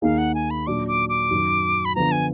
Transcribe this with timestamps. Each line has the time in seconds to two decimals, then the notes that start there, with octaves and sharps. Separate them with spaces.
0.02 D#2 D#3 A#3 D#4 G#4 F5
0.18 F#5
0.35 G#5
0.50 B5
0.67 A#2 F#3 D4 D6
0.88 D6
1.09 D6
1.31 F#2 D#3 F#3
1.85 B5
1.95 D3 F3 B3 F4 A#5
2.12 G#5